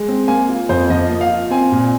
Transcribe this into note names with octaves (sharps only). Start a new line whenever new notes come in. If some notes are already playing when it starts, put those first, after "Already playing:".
Already playing: G#3
C4
A#3 G#5
F4
F2 C5
F3 D#5
A#3
F5
F4
C4 G#5
A#2